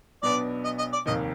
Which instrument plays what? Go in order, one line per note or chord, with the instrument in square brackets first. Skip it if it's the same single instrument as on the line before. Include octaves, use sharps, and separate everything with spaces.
[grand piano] B1 B2 B3 D4 [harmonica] D5
[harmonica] D#5
D#5
D5
[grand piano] F1 D#2 D#3 [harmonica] D#5